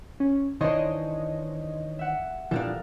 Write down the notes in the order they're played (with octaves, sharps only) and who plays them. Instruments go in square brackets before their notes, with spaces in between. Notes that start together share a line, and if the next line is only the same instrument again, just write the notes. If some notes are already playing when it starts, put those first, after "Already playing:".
[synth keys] C#4
[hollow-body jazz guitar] D#3 E3 D4 [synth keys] C5 C#5 D#5
[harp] E5 F#5
[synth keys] A#2 G3 [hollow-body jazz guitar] E3 F3 D4 [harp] A4 A#4 F5